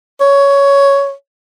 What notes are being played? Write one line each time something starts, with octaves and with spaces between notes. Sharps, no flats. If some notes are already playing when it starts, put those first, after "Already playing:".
C#5